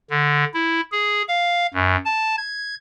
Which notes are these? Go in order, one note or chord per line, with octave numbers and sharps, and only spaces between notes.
D3
E4
G#4
F5
F#2
A5
G#6